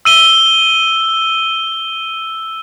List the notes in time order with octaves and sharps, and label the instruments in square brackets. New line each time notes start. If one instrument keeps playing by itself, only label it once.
[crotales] E6 D#7 G7